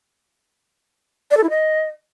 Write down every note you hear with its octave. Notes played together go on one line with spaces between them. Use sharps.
D5
A4
E4
D#5